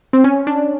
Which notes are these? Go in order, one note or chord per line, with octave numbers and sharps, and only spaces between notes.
C4
C#4
D4